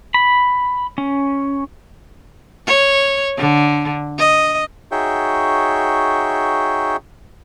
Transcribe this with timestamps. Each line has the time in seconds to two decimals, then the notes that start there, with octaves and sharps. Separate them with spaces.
0.14 B5
0.98 C#4
2.66 C#5
3.37 D3
4.18 D#5
4.91 D#4 F#4 G#4 C#5 E5 G5